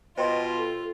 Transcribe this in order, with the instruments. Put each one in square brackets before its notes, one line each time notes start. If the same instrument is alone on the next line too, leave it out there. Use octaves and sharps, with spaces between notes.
[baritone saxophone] B2 [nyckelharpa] F4 [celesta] C5 G5 C6 [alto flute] D#5
[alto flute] A4